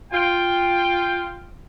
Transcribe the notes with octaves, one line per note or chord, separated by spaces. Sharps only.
F4 G5